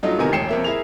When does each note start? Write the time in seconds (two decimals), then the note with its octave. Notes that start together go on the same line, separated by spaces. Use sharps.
0.03 G2 F#3 A3 D#4 F4
0.18 D1 C3 D#3 B3 A#4 G#5
0.32 E1 A1 G5 C7 C#7 E7
0.49 F2 A#3 E5
0.64 E4 G#4 A#4 F7